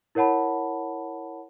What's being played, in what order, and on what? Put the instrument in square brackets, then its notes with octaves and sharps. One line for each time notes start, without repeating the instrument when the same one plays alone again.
[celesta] E4 A#4 C#5 F#5 A5 B5